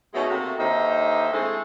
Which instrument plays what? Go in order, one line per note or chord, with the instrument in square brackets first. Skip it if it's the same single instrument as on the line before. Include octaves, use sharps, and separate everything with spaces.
[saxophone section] B2 G#3 A3 C#4 D#4 F#4
C3 A3 A#3 F#4
D#2 D3 D#4 C5 D#5 E5
G#3 A3 C4 E4 G#4 A4